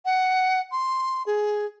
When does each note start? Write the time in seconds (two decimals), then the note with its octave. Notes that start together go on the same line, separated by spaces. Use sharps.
0.05 F#5
0.72 C6
1.26 G#4